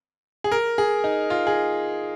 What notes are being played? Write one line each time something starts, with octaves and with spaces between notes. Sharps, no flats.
G#4
A#4
G#4
D#4
F4
G#4